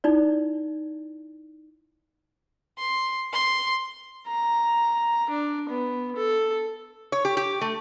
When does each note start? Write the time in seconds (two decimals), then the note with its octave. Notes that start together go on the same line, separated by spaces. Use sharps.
0.04 D#4 E4 D5
2.78 C6
3.33 C6
4.28 A#5
5.30 D4
5.70 B3
6.16 A4
7.12 C#5
7.25 G4
7.37 G4
7.61 A3